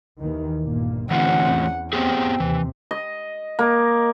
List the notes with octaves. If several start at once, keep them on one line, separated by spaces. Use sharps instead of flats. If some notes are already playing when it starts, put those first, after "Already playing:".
D#2 D#3 E3
G1 A#2 A#3
D3 E3 A3 C4 C#4 F4 F#5
E2
B3 C4 G4 G#4
D#2 C3 E3
D#5
A#3